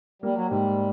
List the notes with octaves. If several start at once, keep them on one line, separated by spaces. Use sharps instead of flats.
G3 A#3
F#3
G#2 G3